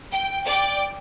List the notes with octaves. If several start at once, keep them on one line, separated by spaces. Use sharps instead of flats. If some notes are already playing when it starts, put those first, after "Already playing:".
G5
D5 G5